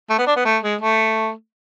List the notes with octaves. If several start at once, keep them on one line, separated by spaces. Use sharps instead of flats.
A3
B3
D4
B3
A3
G#3
A3